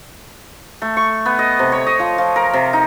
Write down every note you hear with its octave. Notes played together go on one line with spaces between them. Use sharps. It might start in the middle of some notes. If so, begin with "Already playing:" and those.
A3
C#6
B3
D#5
C3
C#5
D#5
F3
F3
A#4
C3
D#4